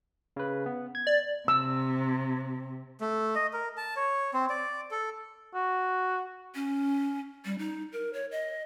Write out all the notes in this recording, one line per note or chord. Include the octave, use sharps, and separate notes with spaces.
C#3 B4
B3
G#6
D5
C3 E6
A3
D#5
A#4
A5
C#5
C4
D5
A4
F#4
C#4
G3
D#4
A#4
C#5
D#5